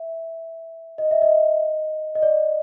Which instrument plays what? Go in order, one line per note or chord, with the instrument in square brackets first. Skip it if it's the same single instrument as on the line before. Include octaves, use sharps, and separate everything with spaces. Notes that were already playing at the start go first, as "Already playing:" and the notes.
Already playing: [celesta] E5
D#5
E5
D#5
D#5
D5